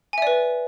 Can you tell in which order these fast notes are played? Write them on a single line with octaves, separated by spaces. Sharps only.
G#5 E5 D5 B4